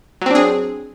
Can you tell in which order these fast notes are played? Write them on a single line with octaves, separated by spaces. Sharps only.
F#3 C4 D4 G#4